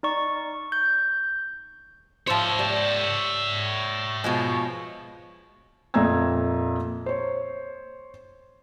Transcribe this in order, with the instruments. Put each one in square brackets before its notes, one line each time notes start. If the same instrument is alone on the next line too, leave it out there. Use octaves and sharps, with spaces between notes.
[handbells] D#4 D5 C#6
G6
[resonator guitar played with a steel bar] F3 C5 [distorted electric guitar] C#5 E5
[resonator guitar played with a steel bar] G3
B2 F3 G#3
[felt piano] F2 A#2 E5 A#5 E6 G#6
C5 C#5